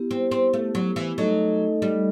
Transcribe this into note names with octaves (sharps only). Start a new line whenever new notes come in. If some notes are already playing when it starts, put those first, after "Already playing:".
Already playing: B3 E4 G4
C4
C4
A3
F#3
E3
F#3 A3 D#4 A4 D#5
G3